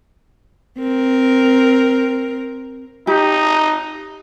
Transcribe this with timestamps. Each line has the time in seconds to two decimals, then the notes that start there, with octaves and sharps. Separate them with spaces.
0.79 C4 A#4
3.07 D#4 G4